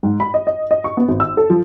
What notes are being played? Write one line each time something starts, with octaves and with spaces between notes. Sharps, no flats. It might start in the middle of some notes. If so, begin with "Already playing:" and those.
G#2
B5
D#5
D#5
D#5
C#6
B3
G#1
E6
A4
F3